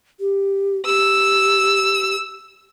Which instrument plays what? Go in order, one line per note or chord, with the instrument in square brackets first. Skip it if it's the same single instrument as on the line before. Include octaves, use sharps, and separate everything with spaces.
[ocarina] G4
[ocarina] G4 [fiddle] E6